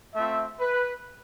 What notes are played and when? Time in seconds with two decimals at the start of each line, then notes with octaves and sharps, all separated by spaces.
0.15 A3 C4 F4 E5
0.60 B4